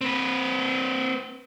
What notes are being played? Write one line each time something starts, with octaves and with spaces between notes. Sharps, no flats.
C4 B4